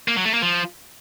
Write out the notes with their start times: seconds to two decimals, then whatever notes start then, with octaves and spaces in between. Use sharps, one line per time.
0.08 A#3
0.16 F#3
0.25 A3
0.34 A#3
0.42 F3